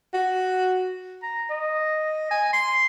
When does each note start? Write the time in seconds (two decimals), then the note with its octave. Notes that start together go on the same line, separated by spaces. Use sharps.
0.14 F#4
1.22 A#5
1.50 D#5
2.31 G#5
2.53 C6